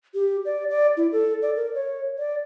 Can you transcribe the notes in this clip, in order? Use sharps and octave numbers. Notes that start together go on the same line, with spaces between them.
G4
D5
D5
E4
A4
D5
A#4
C#5
D5